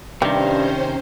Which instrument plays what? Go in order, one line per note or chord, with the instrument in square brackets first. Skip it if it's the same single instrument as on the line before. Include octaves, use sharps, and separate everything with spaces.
[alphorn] G2 [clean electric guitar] C3 D#3 [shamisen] G3 [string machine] C#4 C5